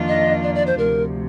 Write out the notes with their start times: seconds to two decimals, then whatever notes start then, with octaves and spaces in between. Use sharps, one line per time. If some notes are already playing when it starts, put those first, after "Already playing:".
Already playing: F2 D#3 A#3 D4 F4
0.08 D#5
0.43 D5
0.55 D5
0.67 C5
0.78 D2 C3 F3 A#4